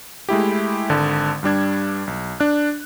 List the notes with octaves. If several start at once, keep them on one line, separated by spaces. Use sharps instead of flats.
G#3 A3 E4 G4
G#1 D3 A5
G2 G3 D4 G#6
B1
D4 F#6